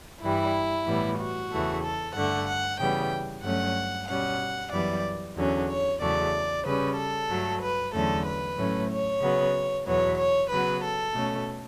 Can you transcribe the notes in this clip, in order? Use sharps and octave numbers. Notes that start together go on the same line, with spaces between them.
G2 E3 G3 E4
A2 E3 G3 B3
F#4
E2 C#3 E3 A3
A4
G2 D3 A3 F#5
F#5
C#3 E3 G3 B3 G5
G2 F#3 A3 C#4 F#5
B2 G3 C#4 F#5
F#2 E3 G3 B3 D5
E2 D3 F#3 C#4
C#5
E2 C#3 F#3 A3 D5
C#3 G3 C#4 B4
A4
G2 F#3 A3
B4
E2 D3 F#3 A3 C#4 A4
B4
A2 F#3 A3 C#4
C#5
C#3 F#3 B3
E2 B2 F#3 B3 C#5
C#5
C#3 F#3 B3 B4
A4
B2 A3 C#4